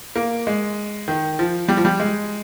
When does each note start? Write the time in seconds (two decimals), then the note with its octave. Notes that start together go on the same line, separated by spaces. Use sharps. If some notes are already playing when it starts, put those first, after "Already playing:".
0.16 A#3
0.47 G#3
1.08 D#3
1.39 F3
1.68 G3
1.77 F3
1.85 G3
2.00 G#3